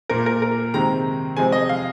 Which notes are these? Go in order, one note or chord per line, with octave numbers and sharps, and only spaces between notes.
A#2 A#3 A#4
A#4
A#4
C3 D#3 G#3 C4 A#5
C3 F3 G#3 C4 G#5
D#5
F5